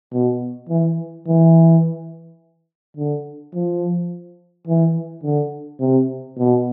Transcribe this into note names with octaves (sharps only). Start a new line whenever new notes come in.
B2
E3
E3
D3
F3
E3
D3
C3
B2